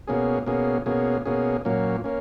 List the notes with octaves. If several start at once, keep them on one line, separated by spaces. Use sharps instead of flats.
B2 A#3 C#4 G#4
B2 A#3 C#4 G#4
B2 A#3 C#4 G#4
B2 A#3 C#4 G#4
A#2 F#3 A#3 C#4
A#3 C#4